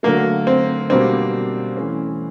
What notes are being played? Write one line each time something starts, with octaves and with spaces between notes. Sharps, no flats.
D3 F#3 A3 A#3
C4
B2 G3 A#3 C4 D4
E3 A3 C#4